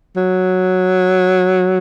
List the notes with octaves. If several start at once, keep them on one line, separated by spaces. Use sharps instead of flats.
F#3